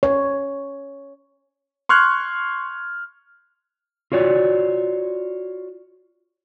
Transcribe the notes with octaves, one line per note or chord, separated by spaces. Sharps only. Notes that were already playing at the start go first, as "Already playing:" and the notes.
C#5
C6 C#6 F6 F#6 G#6
F4 F#4 C#5 D5